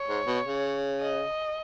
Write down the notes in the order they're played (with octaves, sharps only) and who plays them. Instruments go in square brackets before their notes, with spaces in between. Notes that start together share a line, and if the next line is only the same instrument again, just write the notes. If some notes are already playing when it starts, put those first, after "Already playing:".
Already playing: [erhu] C#5
[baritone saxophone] G#2
B2
C#3
[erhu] D#5